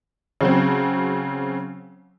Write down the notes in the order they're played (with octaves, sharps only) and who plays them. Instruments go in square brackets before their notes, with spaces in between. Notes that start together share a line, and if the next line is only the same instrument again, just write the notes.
[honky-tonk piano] C#3 F#3 C4